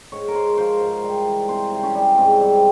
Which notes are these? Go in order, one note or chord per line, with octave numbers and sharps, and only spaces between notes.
G#2 C#5
A#4
G#2 C5
F3 C5
G#2
G3
E3
C3 C5
C3
C#4
G3
G#2 C4
G3